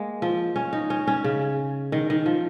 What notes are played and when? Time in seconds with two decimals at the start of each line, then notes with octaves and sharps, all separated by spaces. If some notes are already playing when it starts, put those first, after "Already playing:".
Already playing: G#3 A#3
0.22 F3
0.56 C#4
0.73 D#4
0.90 C#4
1.07 C#4
1.24 C#3
1.92 D#3
2.10 D#3
2.26 F3